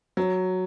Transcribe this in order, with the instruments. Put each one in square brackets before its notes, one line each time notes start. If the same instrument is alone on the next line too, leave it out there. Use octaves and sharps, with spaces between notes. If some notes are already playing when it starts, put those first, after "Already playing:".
[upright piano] F#3